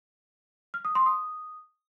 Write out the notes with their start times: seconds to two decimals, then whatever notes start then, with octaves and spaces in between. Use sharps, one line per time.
0.74 F6
0.85 D#6
0.95 C6
1.06 D#6